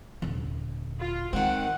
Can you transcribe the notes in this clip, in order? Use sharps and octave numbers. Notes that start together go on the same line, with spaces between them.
D#1 D3
F4
D#3 G#3 C4 F#5